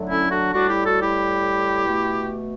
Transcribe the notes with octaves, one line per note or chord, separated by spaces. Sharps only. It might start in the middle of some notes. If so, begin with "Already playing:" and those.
Already playing: D3 F#3 A3
C#4 E4
D4 F#4
A2 G3 D4 F#4
E4 G4
F#4 A4
E4 G4
B2 A3